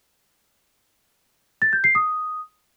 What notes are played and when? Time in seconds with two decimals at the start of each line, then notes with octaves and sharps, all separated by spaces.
1.62 A6
1.73 G6
1.84 C7
1.95 D#6